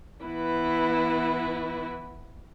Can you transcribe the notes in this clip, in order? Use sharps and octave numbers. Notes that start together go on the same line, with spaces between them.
E3 B3 E4 B4